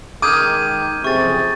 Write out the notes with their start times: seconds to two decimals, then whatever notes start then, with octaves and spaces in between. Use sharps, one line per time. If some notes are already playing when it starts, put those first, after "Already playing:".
0.22 D#3 G#3 D6 D#6 F6 G6 G#6 D#7
1.04 F#1 F2 C3 G#4 C#6 A6